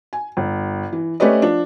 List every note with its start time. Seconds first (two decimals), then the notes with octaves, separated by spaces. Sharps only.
0.13 G#5
0.37 G1
0.93 E3
1.20 A3 C#4 G4 B4 D5 D#5
1.42 F3 D4